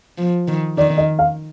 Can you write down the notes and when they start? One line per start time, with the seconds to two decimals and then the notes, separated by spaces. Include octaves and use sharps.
0.18 F3
0.48 D#3
0.78 D#3 D5
0.98 D#5
1.19 F5